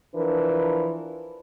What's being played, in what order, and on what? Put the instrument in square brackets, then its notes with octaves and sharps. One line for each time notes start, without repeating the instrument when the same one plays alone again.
[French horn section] E3 F3 D4 A#4 B4